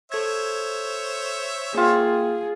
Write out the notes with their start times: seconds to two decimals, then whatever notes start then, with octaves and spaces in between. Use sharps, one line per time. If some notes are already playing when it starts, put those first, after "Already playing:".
0.12 A4 C5 C#5 E5 G#6
1.74 A#3 F4 G#4 G5 E6